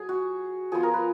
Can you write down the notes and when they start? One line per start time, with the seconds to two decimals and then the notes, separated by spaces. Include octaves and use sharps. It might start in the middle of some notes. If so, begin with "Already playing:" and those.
Already playing: F#3 G#4
0.09 F#4
0.72 F3 B3 F4 G#4
0.83 A#4
0.94 B4